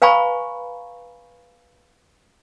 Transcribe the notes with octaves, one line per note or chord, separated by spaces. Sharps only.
B4 F5 G#5 A#5 B5 C#6